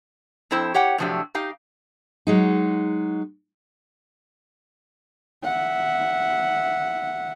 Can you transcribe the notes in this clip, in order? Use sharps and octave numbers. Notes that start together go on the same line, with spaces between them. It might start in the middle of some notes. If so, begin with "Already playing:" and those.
F2 C4 E4 C5
G4 C#5 F#5 G5
A2 C3 F3 F#3 D4 G4
D#4 G4 F5
F#3 G#3 D#4
E5 F#5